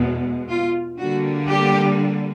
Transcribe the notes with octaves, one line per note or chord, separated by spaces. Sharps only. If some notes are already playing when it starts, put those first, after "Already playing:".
Already playing: E2 B2 G#3
F4
D3 G3 A#3 F#4
G4